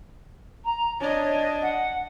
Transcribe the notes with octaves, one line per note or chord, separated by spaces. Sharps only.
A#5
D4 C#5 D#5
F#5